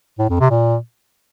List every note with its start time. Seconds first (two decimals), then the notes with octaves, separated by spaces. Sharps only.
0.19 A2
0.30 F2
0.40 C3
0.51 A#2